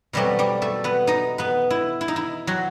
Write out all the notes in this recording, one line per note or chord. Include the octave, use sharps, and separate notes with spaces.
B2 F#3 G3 A3 C4 G4
G3 G4
A3 A4
B3 B4
D#4 D#5
B3 B4
E4
E4
D#4
E4
F#3 F#4